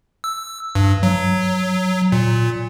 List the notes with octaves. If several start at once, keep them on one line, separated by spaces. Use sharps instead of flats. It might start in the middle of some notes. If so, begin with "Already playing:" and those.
E6
G2
F#3
A#2